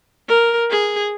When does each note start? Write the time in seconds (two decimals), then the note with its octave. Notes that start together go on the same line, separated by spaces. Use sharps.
0.28 A#4
0.71 G#4